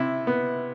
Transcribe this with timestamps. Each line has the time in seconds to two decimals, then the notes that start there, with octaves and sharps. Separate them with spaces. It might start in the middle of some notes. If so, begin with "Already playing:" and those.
Already playing: C3 E4
0.27 B3